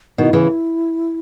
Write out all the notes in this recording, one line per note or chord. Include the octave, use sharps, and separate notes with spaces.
B2 D#3 E4
C#3 E3